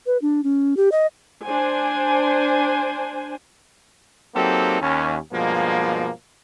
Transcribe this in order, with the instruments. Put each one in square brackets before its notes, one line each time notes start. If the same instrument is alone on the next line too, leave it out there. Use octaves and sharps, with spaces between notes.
[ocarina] B4
D4
C#4
G4
D#5
[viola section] D4 C5 G#5
[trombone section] F#3 A#3 C4 D#4 G4 A4
D#2 C#4
G2 B2 F3 G#3 A#3